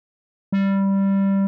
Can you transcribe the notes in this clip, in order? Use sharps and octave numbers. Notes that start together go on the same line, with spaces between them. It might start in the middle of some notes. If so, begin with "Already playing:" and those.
G3